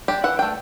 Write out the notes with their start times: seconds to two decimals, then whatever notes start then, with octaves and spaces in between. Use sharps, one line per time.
0.08 D4 G4
0.24 E3 F#5
0.39 A3 D4 G5